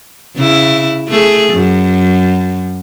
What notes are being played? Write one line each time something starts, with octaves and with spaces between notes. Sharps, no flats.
C#3 E4
A3 G#4
F#2